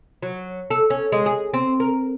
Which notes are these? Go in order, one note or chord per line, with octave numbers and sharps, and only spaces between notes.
F#3
A4
C#4
G#3
G#4
C4
A#4